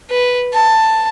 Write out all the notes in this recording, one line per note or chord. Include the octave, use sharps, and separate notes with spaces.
B4
A5